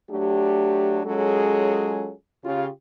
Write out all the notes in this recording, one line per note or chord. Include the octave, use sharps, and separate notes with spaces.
F#3 A3 D4 G4
F#3 G#3 C#4 F4 G#4 A4
C#3 F4 G4